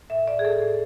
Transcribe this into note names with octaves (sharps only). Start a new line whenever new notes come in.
A2 E5
A2 D5
G#4
A2 A4
A2